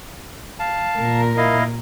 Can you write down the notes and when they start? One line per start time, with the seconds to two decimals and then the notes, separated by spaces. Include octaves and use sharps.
0.59 F5 A5
0.96 A#2 A#4
1.37 E4 D#5 F5